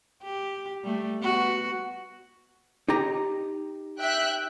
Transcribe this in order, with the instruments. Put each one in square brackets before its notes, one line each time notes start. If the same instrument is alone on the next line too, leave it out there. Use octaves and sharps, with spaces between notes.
[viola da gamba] G4
G3 A3
B3 F#4
[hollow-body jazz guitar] D#4 G4 A#5
[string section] E5 G5 F#6